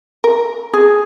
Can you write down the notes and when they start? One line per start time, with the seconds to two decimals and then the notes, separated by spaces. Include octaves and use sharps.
0.24 A#4
0.73 G#4